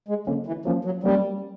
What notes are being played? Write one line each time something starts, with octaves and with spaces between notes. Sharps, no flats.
G#3
D3 F#3 A#3 C#4
E3
F3 F#3 A#3 C#4
F#3
F#3 G3 A#3 C#4